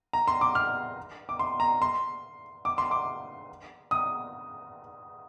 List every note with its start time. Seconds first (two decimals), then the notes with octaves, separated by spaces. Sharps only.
0.13 A#5
0.28 C6
0.41 D6
0.55 F6
1.29 D6
1.39 C6
1.60 A#5
1.82 C6
2.65 D6
2.78 C6
2.91 D6
3.91 D#6